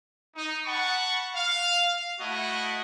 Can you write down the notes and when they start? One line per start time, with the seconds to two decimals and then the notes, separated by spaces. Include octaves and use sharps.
0.35 D#4
0.65 F#5 A5 B5 C#6
1.35 F5
2.20 A3 E4 F#4 D#5